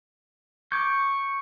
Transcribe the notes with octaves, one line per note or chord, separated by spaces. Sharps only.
C#6 D6 G6